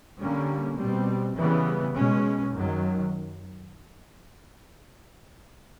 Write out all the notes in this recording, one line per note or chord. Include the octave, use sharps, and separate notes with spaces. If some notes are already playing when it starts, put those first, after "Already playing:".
D3 G3 A#3 C#4
B2 G3 C4
C#3 E3 G3 B3
B2 G#3 C#4
F#2 D#3 F#3